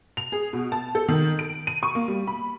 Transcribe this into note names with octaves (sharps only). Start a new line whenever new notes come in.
F7
G#4
B2
A5
A4
D#3
D7
D#7
C#6
A#3
G3
B5